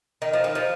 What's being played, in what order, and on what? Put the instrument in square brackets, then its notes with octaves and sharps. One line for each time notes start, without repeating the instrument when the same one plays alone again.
[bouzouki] D#3
F3
D#3
F3